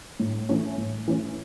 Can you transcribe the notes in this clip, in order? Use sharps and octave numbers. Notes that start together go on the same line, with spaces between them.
A2
E3 A3 C#4
A2
E3 A3 C#4